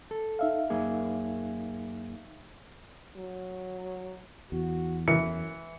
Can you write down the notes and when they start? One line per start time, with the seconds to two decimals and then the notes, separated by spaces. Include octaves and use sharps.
0.11 A4
0.39 D#4 E5 F5
0.70 F#2 A#3 G#4
3.16 F#3
4.52 E2 F#4
5.08 F#2 E3 C#7